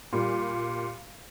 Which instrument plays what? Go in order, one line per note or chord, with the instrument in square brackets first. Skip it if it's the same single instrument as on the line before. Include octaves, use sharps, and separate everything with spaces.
[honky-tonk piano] A#2 G3